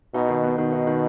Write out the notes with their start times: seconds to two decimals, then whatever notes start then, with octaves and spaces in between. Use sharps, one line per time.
0.14 B2 D#4
0.29 D#3
0.44 B3
0.58 B2 D#3
0.73 D#4
0.87 D#3